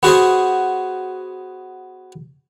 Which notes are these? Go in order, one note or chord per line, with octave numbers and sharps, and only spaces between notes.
B3 F#4 G#4 C5